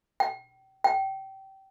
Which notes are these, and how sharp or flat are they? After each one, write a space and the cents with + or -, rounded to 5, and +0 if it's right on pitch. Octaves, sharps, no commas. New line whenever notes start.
G5 -35
G5 -25